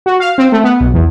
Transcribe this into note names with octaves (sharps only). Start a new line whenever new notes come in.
F#4
F5
C4
A3
B3
B1
E2